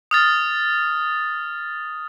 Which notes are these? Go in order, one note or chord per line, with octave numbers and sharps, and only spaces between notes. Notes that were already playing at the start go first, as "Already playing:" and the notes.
D#6 F6 A6